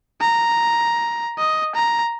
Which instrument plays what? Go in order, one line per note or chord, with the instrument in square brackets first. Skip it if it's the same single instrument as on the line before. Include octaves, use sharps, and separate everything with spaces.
[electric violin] A#5
D#5
A#5